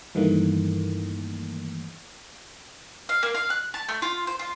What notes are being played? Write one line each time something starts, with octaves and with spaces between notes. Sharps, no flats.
G2 D#3 E3 A3 A#3
F5
A#3
F5
F#6
A5
A3
F4
C5
F4